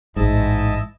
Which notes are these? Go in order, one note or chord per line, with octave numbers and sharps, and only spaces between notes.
A1 G#2 E4 D#5 A5